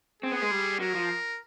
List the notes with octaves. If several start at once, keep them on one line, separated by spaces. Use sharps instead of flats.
C4 G#4
B3
G#3
G3
F#3 A#4
F3